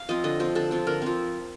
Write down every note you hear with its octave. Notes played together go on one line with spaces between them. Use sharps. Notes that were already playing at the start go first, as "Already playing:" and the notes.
Already playing: F5
F3 C4 D#5
D3 D#5
F3 C4 C5
D3 A4
F3 C4
D3 A#4
F3 C4